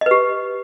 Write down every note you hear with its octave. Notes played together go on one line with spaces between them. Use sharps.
G4 B4 D#5